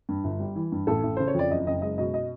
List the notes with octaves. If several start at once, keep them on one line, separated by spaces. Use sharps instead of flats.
G2
G1
G3
E3
G2
A1 A4
A1
C#3 C5
C#5
F2 D5
F#1 D#5
F#1 D#5
G#3 D#5
B2 D#5
D#5